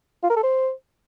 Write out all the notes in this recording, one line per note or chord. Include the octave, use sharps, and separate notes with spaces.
F4
A#4
A4
C5